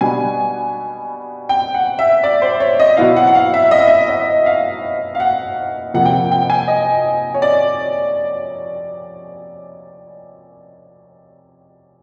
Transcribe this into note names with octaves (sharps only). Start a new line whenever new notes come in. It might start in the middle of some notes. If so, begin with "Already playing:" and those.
B2 G3 B3 D4 G#5
G5
F#5
E5
D5
C5
C#5
D#5
B2 F#3 B3 E4 F5
F#5
F#5
F5
E5
D#5
E5
D#5
D#5
F5
F5
F#5
F2 C3 F3 A#3 F#5
G5
F#5
G5
G#5
D#5
C#5
D5